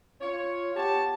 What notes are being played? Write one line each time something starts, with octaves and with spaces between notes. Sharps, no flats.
F4 C#5
B3 G4 C#5 A5